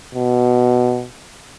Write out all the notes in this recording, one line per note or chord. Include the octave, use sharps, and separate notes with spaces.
B2